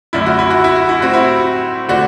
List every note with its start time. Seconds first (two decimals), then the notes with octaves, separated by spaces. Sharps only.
0.13 F#2 D3 A3 D4 E4
0.26 F#4
0.39 E4
0.50 F#4
0.64 E4
0.76 F#4
0.89 E4
1.01 A2 G3 C4 F#4
1.14 E4
1.88 D3 A3 D4 F#4